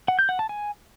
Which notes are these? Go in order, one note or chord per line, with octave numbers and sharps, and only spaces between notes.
F#5
G6
F#5
A5
G#5